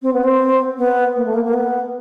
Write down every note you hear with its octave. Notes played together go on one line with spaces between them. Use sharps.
C4
B3
C4
B3
A#3
A3
A#3
A#3
B3